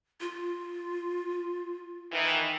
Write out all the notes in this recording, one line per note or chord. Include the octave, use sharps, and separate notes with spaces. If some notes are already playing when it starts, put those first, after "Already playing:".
F4
D#3 E3